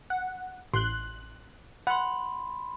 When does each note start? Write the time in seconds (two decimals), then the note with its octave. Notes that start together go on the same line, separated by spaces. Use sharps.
0.10 F#5
0.74 A1 C6 F#6
1.87 F#5 B5 C6